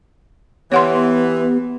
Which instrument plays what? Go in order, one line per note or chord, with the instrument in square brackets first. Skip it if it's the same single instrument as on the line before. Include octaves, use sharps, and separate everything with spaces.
[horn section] E3 [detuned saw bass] B3 [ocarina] G4 [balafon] C#5 F#5 C6